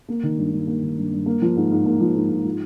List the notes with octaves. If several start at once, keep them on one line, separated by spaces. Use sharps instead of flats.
A#3
D#3
G2
G2
A#3
D#3
G2
G2
A#3
F3
G#2
G#2
A#3
F3
G#2
G#2
F3